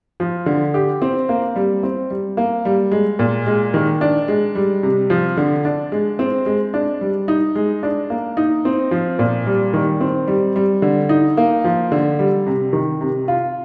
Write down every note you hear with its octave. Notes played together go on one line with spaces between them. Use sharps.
F3
D3
G4
C4
A#3
G3
C4
G3
A#3
G3
G#3
A#2
G#3
D#3
D4
G#3
G3
C3
F3
D3
D4
G#3
C4
G#3
D4
G3
D#4
G#3
D4
A#3
D#4
C4
F3
A#2
G3
D#3
C4
G3
G3
D3
D#4
A#3
F3
D3
G3
C3
D#3
C3
F4